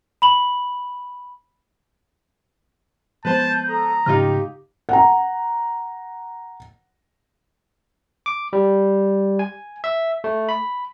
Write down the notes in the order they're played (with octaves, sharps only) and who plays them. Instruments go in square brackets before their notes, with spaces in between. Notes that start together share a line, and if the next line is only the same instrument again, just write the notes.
[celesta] B5 F#7
[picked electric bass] F3 G#3 B3 [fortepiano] B4 C5 [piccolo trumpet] A5 [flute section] G6
[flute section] A4 D#6 [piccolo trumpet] A#5
[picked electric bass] G#2 C#3 A3 [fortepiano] D#4 F4 F6 [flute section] G4
[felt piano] F#5 A#5
[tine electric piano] D6
G3
G#5
E5
A3
B5